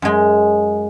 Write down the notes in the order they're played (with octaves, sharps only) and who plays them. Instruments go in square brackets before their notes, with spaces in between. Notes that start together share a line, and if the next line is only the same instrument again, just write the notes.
[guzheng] F#2 G#3